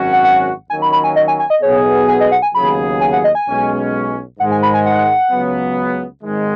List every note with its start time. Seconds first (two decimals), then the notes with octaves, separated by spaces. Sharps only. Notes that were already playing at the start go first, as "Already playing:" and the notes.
Already playing: G#1 F#2 F#3 C#4 F#4
0.13 F#5
0.24 F#5
0.70 D#2 D#3 F#3 C#4 G#5
0.82 B5
0.92 B5
1.04 G#5
1.16 D#5
1.28 G#5
1.39 G#5
1.50 D#5
1.62 B1 B2 B3 G#4 C#5
2.08 G#5
2.20 D#5
2.32 F#5
2.42 G#5
2.55 D#2 C#3 F#3 B3 G#4 B5
3.01 G#5
3.13 F#5
3.24 D#5
3.35 G#5
3.46 B1 B2 G#3 C#4
4.40 G#2 D#3 G#3 F#5
4.51 G#5
4.63 B5
4.74 G#5
4.86 F#5
5.31 C#2 C#3 F#3 B3
6.23 G#1 G#2 D#3 G#3